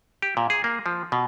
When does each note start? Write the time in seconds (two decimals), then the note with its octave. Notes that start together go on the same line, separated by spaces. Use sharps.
0.22 G4
0.37 A#2
0.50 G#4
0.64 A#3
0.86 F3
1.12 B2